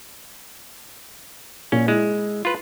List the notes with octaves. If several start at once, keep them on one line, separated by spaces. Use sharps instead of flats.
A#2 C#4
G#3 E4
F4 B4